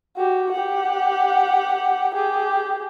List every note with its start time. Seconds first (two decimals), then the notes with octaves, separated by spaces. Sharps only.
0.17 F#4 G4
0.52 G4 F#5
2.15 G4 G#4